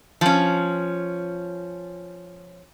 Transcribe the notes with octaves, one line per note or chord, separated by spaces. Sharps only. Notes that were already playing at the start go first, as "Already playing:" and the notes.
F3 C#4